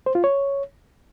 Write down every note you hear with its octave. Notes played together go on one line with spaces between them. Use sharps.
C5
F4
C#5